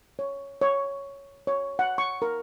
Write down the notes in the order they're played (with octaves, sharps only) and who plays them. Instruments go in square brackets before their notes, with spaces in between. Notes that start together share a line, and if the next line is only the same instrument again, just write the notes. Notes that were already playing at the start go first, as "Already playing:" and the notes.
[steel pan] C#5
C#5
C#5
F#5
C#6
A#4